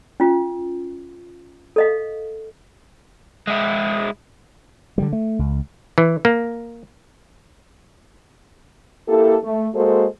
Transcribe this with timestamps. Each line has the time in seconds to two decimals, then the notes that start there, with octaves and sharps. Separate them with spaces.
0.20 C#4 F4
1.76 A4 D#5 F5
3.47 G#3 E4
4.98 D3 E3 G3
5.13 A3
5.39 C#2
5.98 E3
6.25 A#3
9.08 A#3 E4 G4 A4
9.44 A3
9.74 G#3 A#3 F#4 A4 C5